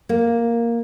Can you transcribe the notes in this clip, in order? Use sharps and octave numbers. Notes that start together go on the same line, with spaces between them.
A#3